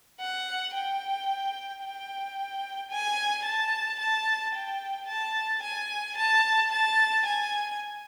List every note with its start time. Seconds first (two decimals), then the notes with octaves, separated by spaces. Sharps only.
0.20 F#5
0.74 G5
1.83 G5
2.90 G#5
3.45 A5
3.99 A5
4.55 G5
5.08 A5
5.63 G#5
6.17 A5
6.72 A5
7.26 G#5